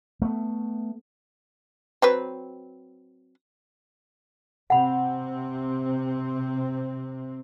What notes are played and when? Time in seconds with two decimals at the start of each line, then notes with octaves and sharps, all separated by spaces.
0.22 A3 B3
2.02 F#3 C4 B4
4.70 C3 C4 F#5 B5